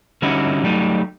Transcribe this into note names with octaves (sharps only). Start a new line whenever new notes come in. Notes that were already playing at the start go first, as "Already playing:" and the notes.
D3 G3 C#4 D#4 E4 F#4
F#3 G3 A3 D#4